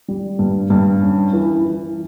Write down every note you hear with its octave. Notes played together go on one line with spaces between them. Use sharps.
G3
G2
G2
C#4
E3
E3